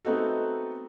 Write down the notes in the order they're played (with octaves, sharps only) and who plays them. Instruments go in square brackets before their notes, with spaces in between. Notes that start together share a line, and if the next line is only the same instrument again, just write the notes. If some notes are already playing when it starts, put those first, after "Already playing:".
[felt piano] A3 B3 C4 D#4 F#4 A4